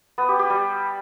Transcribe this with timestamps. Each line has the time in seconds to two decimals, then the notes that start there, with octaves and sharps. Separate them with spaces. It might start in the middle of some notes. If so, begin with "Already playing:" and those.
0.18 B3
0.29 G4
0.39 G4
0.50 G3